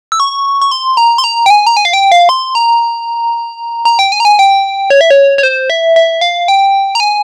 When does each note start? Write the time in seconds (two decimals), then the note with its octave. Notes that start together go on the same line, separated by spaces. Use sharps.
0.12 E6
0.20 C#6
0.62 C#6
0.71 C6
0.97 A#5
1.18 C6
1.24 A#5
1.46 G5
1.50 G#5
1.67 A#5
1.77 G#5
1.85 F5
1.93 G5
2.12 F5
2.29 C6
2.55 A#5
3.85 A#5
3.99 G5
4.12 G#5
4.20 A#5
4.25 G#5
4.39 G5
4.90 C#5
5.01 E5
5.11 C#5
5.38 C#5
5.43 C5
5.70 E5
5.96 E5
6.21 F5
6.48 G5
6.95 A#5
7.00 G#5